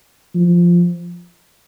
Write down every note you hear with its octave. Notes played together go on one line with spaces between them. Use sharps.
F3